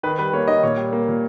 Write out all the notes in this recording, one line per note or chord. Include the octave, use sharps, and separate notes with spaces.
D#3 B4
G3 B4
A#3 C#5
D#3 D#5
A#2 C#5
G3
A#3
A#2